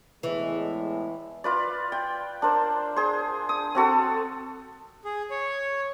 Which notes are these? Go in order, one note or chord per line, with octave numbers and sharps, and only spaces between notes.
E2 A2 E3 G#3
F4 B4 D5
G5
D4 A#4 C5
G#4 C5
D#6
C4 F#4 A4
G#4
C#5